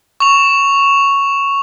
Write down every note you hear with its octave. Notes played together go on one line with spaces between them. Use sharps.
C#6 F7